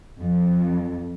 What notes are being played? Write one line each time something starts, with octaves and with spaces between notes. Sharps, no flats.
F2